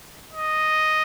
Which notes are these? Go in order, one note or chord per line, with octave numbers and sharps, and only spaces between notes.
D#5